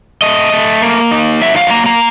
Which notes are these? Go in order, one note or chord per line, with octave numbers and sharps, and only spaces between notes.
A3 D#5
A3
A#3
D#4
F#3 E5
F5
A#3 A#5
A#5